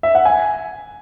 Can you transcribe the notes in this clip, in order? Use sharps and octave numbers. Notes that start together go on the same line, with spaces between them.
E5
F#5
G#5